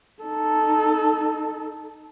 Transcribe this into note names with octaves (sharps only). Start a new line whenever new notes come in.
D#4 A4